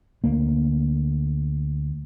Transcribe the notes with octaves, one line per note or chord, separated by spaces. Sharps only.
D2 A#3